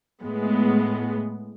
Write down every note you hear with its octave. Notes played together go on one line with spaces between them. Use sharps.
A2 G#3 B3